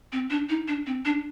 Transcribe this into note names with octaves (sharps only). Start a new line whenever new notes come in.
C4
D4
D#4
D4
C4
D4